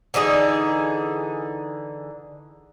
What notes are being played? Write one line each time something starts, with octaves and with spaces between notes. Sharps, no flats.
D3 E3 D#4 G#4